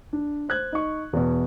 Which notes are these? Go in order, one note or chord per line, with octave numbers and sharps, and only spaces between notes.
D4
C5 F#6 G#6
D#4 C#6
E2 B2